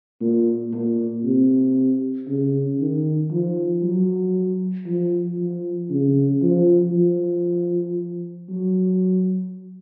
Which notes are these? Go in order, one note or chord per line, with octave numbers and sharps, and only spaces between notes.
A#2
A#2
C3
C#3
D#3
F3
F#3
F3
F3
C#3
F3
F3
F#3